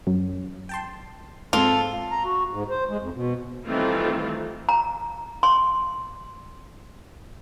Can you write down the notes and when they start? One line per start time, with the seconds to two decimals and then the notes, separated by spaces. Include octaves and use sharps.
0.07 F#2
0.69 G5 A5 C6
1.53 G#2 G#3 C4 F4 A4
2.11 A#5
2.24 F#4
2.51 G#2
2.70 C5
2.89 G#3
3.01 F2
3.15 B2
3.67 D#3 E3 G3 A3 C4 F4
4.69 A#5
5.43 C6